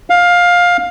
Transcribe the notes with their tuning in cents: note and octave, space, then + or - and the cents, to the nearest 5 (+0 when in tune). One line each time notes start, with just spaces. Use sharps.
F5 +15